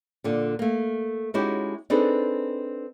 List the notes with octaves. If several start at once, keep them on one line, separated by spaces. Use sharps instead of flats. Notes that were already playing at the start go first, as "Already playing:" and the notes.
A#2 D3
A3 A#3
G#3 C#4 D#4 E4 F#4 G4
C4 D4 D#4 G#4 A4 B4